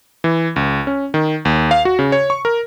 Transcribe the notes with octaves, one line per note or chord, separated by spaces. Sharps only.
E3
C#2
C#4
D#3
D#2
F5
F#4
C#3
C#5
C#6
A#4